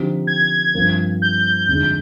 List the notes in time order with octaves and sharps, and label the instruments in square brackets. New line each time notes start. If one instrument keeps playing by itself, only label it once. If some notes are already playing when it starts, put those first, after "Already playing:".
Already playing: [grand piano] D3 F3 C4 D#4 G4
[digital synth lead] G#6
[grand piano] G2 F3 C4 F4 A#4
[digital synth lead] G6
[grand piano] F2 D3 G#3 D#4